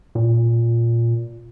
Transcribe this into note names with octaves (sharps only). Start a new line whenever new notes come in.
A#2